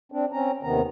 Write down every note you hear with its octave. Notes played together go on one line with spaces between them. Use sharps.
C4 D4
C4 C#4 A#5
D#2 C3 D#3 B3 A#5